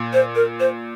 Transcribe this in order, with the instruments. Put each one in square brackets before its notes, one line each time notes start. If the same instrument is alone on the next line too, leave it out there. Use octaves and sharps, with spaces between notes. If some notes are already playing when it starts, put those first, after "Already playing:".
Already playing: [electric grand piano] A#2
[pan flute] C5
A#4
C5